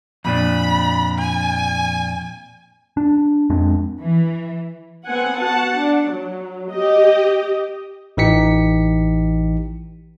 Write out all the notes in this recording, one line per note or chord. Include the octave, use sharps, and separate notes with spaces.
F2 A#2 D4 B5
G#5
D4
F2 G#3 C4 D4
E3
B3 C4 F#5 G#5
F#4 F#5 A5
D4
F#3
G4 D#5
A1 E3 D#4 G4 B6 C#7